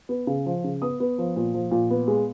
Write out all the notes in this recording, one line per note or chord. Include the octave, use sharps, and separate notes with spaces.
B3
C#3
F3
C#3
B3 D#6
B3
F3
A#2
F3
A#2
B3
G#3